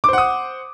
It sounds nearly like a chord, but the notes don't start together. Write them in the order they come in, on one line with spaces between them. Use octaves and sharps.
D6 C5 F#5 D#6